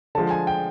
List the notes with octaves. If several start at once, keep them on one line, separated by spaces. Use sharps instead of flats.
D3 F3 G#3 A5
G#5
G5